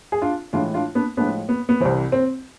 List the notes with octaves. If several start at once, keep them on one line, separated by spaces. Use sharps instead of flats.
G#4
D4 F4
A2 E3 G#3 D4 F4
D4 F4
B3 D4
A2 F3 G#3 B3 D4
B3
B3
C2 C3 E3 C4
C4